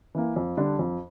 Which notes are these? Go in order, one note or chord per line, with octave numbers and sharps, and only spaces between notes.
E3 A#3
F2
D3 G3 D4
F2